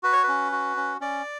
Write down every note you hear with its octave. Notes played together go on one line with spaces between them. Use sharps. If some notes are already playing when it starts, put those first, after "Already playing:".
F#4 B4
C#5
C#4 B4
F#4
C#4
C#4 D5